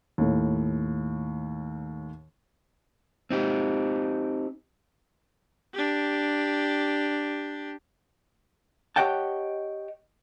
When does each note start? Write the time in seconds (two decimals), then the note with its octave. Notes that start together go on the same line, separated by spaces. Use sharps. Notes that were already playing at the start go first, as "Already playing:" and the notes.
0.18 D#2 A2
3.31 C4 D#4 G4
5.74 D4 G4
8.96 G4 C#5 D#5 F#5 G5 A5